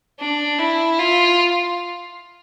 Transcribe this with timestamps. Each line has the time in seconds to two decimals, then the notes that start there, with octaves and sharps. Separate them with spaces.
0.20 D4
0.59 E4
0.99 F4